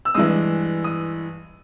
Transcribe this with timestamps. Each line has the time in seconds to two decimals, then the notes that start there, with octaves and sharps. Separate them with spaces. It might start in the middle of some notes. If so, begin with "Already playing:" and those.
0.05 E6
0.14 G2 E3 G#3 D#6
0.84 D#6